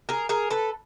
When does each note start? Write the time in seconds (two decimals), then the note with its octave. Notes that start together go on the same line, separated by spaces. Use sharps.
0.09 G#4 A#4
0.29 G#4 A#4
0.50 A4 B4